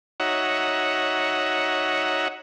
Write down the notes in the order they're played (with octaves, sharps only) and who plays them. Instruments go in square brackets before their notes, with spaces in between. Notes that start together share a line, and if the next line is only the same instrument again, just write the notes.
[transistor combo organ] D#4 F#4 C#5 E5 F#5 A#5